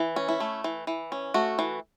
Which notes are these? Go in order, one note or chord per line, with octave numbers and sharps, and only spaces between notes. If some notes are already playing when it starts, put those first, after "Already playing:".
Already playing: E3
C#4
E4
A3
E3
E3
C#4
A3 F#4
E3